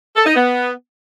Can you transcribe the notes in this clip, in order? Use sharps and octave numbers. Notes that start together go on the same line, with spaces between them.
A4
D#4
B3